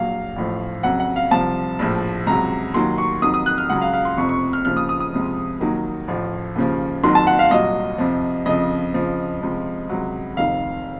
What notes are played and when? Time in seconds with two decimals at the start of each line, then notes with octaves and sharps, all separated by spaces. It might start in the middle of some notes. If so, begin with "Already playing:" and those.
Already playing: A#1 A#2 F#3 F5
0.36 A1 A2 F3
0.83 F2 C#3 F#3 F#5
1.00 F#5
1.16 F5
1.31 C2 C3 F3 A5
1.79 A#1 A2 F3
2.26 C#2 C3 F#3 A#5
2.74 D#2 D#3 F#3 C6
2.98 C#6
3.22 F2 D#3 F#3 D#6
3.34 D#6
3.46 F#6
3.58 F6
3.69 C#2 C#3 F#3 F#5
3.81 F5
3.93 F5
4.05 C6
4.17 F1 F2 C3 C#6
4.29 C#6
4.53 F6
4.65 D#2 C#3 F3 F6
4.77 D#6
4.89 D#6
5.00 D#6
5.12 C#2 C3 F3
5.60 D#2 D#3 F#3
6.08 A1 A2 F3
6.56 D#2 C#3 F3
7.03 F#1 F2 D#3 F#3 C6
7.15 A5
7.27 F#5
7.39 F5
7.51 C2 A#2 F#3 D#5
7.98 F2 C3 F3
8.46 F2 C#3 F3 D#5
8.94 F2 C#3 F3
9.41 C#2 C3 F3
9.89 C#2 C3 F#3
10.37 F1 F2 D#3 F5